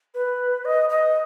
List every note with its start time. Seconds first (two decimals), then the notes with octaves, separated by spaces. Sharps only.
0.14 B4
0.65 D#5
0.90 D#5